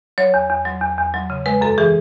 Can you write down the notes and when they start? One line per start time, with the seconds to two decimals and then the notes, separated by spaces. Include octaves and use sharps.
0.18 F#3 C#5
0.34 E2
0.50 E2
0.65 F#3
0.81 E2
0.98 E2
1.14 F#3
1.30 C#3
1.46 G#3 B4
1.61 F#2 A4
1.78 E3 G#4